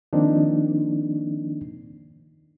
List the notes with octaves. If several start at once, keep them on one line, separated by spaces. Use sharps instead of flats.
D#3 F3 A#3 C4 D4 D#4